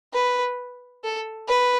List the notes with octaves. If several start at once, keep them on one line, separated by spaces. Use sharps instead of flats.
B4
A4
B4